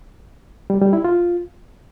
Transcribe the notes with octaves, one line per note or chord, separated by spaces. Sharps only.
G3
G3
E4
F4